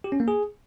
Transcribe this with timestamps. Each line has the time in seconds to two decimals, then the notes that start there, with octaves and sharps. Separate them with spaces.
0.04 G4
0.12 C#4
0.20 A#3
0.28 G#4